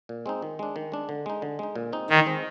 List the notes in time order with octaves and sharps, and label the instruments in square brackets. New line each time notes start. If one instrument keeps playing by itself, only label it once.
[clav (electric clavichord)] A#2
G#3 C4 D#4
D#3
G#3 D4
D#3
G#3 D4
D3
G#3 D#4
D3
G#3 D#4
A#2
G#3 C4 D#4
[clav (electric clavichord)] A#2 [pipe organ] D#3
[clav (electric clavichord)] G#3 C4 D#4